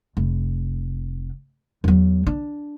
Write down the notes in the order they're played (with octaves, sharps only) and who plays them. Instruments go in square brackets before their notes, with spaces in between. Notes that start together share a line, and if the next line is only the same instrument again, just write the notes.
[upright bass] F1
E2 F#3
D4